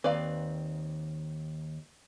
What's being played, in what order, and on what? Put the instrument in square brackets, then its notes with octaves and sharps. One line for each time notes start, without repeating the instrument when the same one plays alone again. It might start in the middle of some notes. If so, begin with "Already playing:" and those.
[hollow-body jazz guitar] D#2 C4 [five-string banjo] B4 D5 F5